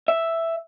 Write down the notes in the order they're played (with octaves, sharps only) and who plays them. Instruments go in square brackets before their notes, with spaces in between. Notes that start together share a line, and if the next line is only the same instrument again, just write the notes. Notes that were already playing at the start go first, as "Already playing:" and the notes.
[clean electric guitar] E5